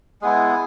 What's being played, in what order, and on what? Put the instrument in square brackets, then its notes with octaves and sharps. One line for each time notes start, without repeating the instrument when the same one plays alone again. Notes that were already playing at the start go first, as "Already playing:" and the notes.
[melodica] G#3 B3 E4 G#4